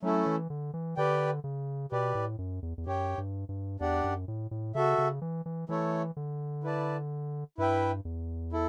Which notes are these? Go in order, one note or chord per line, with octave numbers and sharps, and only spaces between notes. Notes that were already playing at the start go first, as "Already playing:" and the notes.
F#3 A3 C#4 E4 A4
E3
D3
E3
D3 G4 B4 D5 G5
C#3
B2 G4 B4 D5
A2
F#2
E2
E2
F#2 G4 C#5 G5
G2
G2
E2 D4 G4 D5 F#5
F#2
A2
A2
C#3 F#4 A4 E5
C#3
E3
E3
E3 A3 E4 A4 C#5
D3
E4 B4 D5 A5
G2 E4 B4 E5 G5
E2
E4 A4